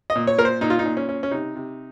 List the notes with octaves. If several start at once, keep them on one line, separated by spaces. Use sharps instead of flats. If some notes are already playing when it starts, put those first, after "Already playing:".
D#5
A#2
C#5
A#2 A#4
C5
A#2 D#4
F4
D#4
A#2
C#4
C#4
C#4
C3 D#4
C3